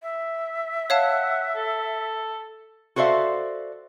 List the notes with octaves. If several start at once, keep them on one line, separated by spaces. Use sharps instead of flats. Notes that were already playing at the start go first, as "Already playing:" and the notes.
E5
C#5 F5 F#5 A5
A4
F#4 A4 C5 D5 E5 F5